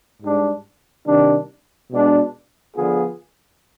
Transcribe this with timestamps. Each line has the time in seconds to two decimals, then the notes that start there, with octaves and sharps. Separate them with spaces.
0.22 G#2 G3 D4
1.06 C3 D#3 G3 D4
1.91 B2 G#3 D4
2.76 D3 F3 B3 F4 G#4